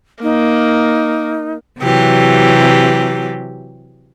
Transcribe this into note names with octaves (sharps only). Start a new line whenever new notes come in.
A#3 D#4
C3 E3 F#3 G4